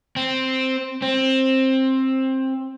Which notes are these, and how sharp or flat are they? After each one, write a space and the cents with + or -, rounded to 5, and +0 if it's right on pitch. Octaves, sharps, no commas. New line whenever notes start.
C4 +0
C4 +15